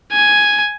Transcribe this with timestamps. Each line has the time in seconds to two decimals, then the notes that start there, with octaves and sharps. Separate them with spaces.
0.12 G#5